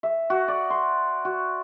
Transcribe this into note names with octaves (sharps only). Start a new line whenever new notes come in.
E5
F#4
D5
C6
F#4